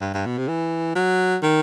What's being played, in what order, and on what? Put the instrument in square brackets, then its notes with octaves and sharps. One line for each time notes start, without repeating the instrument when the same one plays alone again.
[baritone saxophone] G2
G2
B2
C3
E3
F#3
D#3